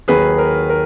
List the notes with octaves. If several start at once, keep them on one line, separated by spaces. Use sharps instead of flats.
D#2 D#3 F#3 G#4 B4
A#4
A#4